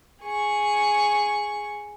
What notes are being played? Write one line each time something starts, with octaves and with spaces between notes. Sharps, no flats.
G#4 C#6